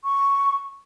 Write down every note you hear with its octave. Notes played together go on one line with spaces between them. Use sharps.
C#6